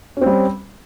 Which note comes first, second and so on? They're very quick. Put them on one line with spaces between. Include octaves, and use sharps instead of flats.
C#4 C4 G3